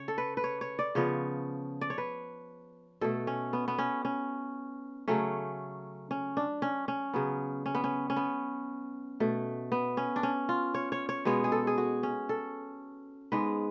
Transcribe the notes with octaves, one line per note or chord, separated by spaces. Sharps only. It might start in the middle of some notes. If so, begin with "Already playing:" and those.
Already playing: C#3 C#5
A4
B4
B4
C#5
C#5
D5
C#3 F3 B3 C#5
D5
C#5
B4
B2 A3 A4
C#4
B3
B3
C#4
C#4
C#3 F#3 A3 C#4
C#4
D4
C#4
C#4
C#3 F#3 B3
C#4
B3
C#4
C#4
B3
B2 A3
B3
C#4
D4
C#4
F4
C#5
C#5
C#5
B2 G#3 B3 C#5
G#4
A4
G#4
F#4
C#4
A4
G#2 G#3 B3 B4